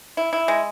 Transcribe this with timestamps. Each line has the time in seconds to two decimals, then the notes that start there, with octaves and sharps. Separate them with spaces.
0.17 E4
0.33 E4
0.48 G#3